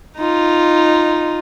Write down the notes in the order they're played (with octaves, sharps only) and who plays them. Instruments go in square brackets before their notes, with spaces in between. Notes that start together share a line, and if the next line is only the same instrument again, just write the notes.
[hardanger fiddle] D#4 F4